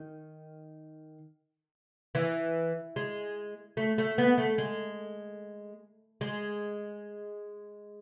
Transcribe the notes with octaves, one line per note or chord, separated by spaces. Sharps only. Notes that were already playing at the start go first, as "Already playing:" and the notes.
Already playing: D#3
E3
G#3
A3
A3
B3
A3
G#3
G#3